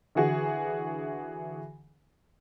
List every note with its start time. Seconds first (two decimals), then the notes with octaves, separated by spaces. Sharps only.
0.15 D3 E3 F#4 G#4